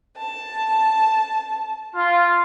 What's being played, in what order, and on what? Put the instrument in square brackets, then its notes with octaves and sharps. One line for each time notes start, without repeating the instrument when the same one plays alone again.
[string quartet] A5
[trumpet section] F4